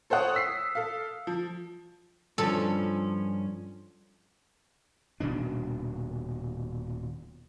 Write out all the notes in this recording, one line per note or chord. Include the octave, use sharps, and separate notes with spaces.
A4 C5 C#5 F#5 D#6
E6 B6 C7
A4 F5
F3
G2 F3 C#4 A4
D#1 B2 D#3 D4